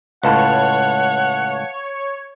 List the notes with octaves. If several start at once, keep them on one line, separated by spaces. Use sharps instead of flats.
C#2 A2 B4 C#5 F5 F#5 A5